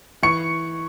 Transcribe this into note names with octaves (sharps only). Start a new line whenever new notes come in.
E3 C#6 C#7